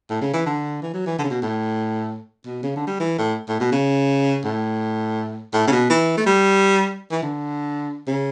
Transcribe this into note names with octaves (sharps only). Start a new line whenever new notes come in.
A2
C#3
E3
D3
E3
F#3
E3
D3
C#3
B2
A2
B2
C#3
D3
G3
E3
A2
A2
B2
C#3
A2
A2
C#3
B2
E3
A3
G3
E3
D3
C#3